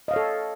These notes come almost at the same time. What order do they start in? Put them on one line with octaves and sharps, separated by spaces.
D#5 F5 C#5 A4